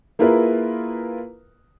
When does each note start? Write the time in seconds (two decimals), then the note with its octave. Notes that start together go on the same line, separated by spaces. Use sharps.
0.19 A#3 E4 F4 G#4 A#4 B4